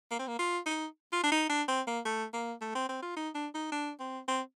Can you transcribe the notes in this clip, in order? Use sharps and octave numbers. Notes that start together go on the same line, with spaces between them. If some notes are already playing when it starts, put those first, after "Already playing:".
A#3
C4
A#3
F4
D#4
F4
D4
D#4
D4
C4
A#3
A3
A#3
A3
C4
C4
F4
D#4
D4
D#4
D4
C4
C4